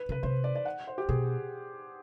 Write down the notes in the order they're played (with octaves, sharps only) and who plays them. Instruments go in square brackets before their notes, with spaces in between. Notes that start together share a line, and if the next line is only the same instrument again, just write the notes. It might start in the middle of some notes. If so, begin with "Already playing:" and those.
Already playing: [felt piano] B4
[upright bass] C#3
[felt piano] B4
[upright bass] C3 [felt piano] C5
[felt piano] D5
D5
F#5
C5
G4
[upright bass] B2 [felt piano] G#4